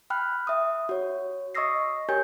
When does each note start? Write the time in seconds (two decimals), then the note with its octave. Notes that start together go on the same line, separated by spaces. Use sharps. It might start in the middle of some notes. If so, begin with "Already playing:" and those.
0.10 G5 B5 F6 F#6
0.47 E5 D#6
0.89 F#4 C#5
1.55 D#5 C#6 D#6 E6 A#6 C7
2.09 G4 A#4 C#5 G#5 G6